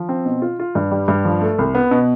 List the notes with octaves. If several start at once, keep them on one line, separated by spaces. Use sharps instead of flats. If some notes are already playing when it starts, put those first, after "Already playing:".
Already playing: F3
C4
B2
F4
F4
G2
G3
G2
F3
A3
C2
B3
B2